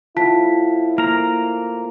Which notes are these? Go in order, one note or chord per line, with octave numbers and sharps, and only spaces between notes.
A2 F3 E4 F4 A5 B6
A#3 A#5 F6